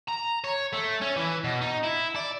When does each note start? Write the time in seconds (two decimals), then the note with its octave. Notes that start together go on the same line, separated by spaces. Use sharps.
0.08 A#5
0.44 C#5
0.73 A3
1.01 C#4
1.16 E3
1.44 B2
1.61 D#4
1.83 E4
2.16 D5